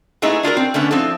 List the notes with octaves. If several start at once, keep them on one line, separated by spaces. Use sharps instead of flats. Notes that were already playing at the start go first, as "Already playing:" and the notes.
G#3 A3 B3 D#4 E4 G#4
D4 F4 F#4 A#4
C4
D3 A3 B3 C#4
F3 C4 E4 A4